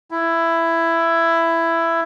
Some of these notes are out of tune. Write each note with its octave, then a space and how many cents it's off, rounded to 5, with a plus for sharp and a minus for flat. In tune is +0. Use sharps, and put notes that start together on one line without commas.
E4 +10